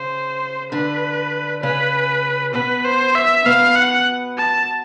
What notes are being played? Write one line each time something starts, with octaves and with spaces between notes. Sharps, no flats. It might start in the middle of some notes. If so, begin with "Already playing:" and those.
Already playing: C#3 C#4 C5
D3 D4 B4
C#3 C#4 B4
B2 B3 B4
C5
E5
B2 B3 F5
F#5
A5